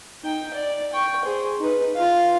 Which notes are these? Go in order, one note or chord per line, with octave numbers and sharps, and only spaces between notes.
D#4 G5
D5
G5 C#6
G#4 C5
D#4 B4
F4 F5